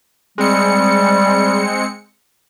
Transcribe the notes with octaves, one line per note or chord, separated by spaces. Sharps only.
G3 G#3 C4 C#7